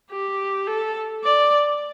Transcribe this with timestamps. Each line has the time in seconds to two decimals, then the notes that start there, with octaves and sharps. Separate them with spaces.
0.10 G4
0.67 A4
1.24 D5